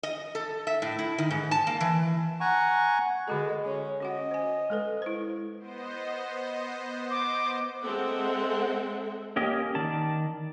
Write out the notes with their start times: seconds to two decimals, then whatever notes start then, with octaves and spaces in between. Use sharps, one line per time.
0.03 D#5
0.35 A4
0.67 E5
0.82 A2
0.99 E4
1.18 D#3
1.31 G#2
1.51 A5
1.67 A#3
1.81 E3
2.40 F#5 G#5 A#5 C#6
3.28 D3 G#3 F#4 A4
3.65 C#4
4.00 C#4 F#4 D#5 F#5
4.31 C5 G#5
4.70 G#3 A4 B4
5.02 E4 C5
5.57 B3 C5 D#5
7.11 D6
7.81 G#3 C4 A4 E5 F#5
9.36 A#3 C#4 G4 D#5
9.75 D#3 D5 A5